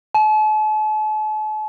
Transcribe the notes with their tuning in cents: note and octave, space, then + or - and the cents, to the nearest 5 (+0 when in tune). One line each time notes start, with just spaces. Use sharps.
A5 -45